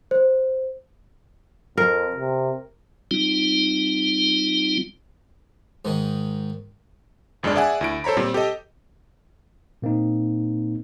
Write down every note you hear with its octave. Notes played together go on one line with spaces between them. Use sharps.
C5
F2 A#4
C3
G3 C4 D#4 F4
G#2 D#3
G1 F2 G#3 D4 D5
G#4 D5 E5 F#5 G#5
D2 E4 D7
A4 C5 C#5 A#5 B5
A#2 G3 C4
G4 A4 D#5
A#2 A#3 C4 D#4